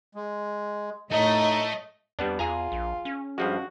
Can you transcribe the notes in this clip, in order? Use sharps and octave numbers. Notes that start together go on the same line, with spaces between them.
G#3
A2 A3 D#4 C#5 D#5
F2 G3 B3 D4
E2 F4 G#4 G#5 A#5
A#1
C#4
G2 F3 G#3 F#4